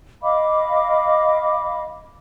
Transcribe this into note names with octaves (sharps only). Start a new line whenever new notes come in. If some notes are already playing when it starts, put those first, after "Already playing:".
D#5 F5 B5 D6